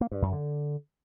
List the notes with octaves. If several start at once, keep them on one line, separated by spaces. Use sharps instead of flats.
A#3
G2
F#2
D3